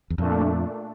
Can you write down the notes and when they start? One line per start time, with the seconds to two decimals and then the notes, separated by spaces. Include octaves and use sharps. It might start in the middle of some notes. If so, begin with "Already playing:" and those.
0.10 E2
0.18 F2 A#2 A3 D4